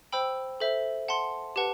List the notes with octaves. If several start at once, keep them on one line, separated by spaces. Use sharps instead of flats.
C5 G5 B5 E6
A4 C5 E5
F#5 A5 C6
G4 B4 F#5 A5